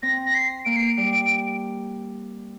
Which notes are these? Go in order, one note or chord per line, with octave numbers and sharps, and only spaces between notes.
C4 A#6
A#6
C7
A#3 D7
C7
D7
G3